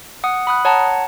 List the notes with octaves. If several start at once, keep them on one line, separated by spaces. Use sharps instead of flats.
F#5 D#6
B5 D#6 F#6
C#5 F#5 A5 A#5